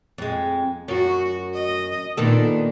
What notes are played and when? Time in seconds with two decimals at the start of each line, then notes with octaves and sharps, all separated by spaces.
0.18 F2 G#3
0.88 F#2 F#4
1.54 D#5
2.17 A#2 D#3 B3 D4 A4